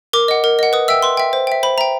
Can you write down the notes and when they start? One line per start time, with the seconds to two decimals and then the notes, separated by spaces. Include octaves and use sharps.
0.13 A#4 D6
0.28 D#5 F#5
0.44 A#4
0.59 D#5 F#5
0.73 B4 D#6
0.88 E5 G5 E6
1.02 B4 C6
1.17 E5 G5
1.33 C5
1.47 E5 G5
1.63 C5 B5
1.78 E5 G5 A#5